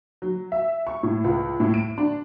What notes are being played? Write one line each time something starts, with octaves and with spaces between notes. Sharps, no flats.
F#3
E5
C#6
A2
C#2
A2
D7
D4